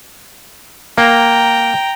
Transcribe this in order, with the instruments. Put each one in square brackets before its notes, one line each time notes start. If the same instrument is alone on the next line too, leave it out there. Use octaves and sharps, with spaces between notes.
[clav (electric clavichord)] A#3 [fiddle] G5 A#5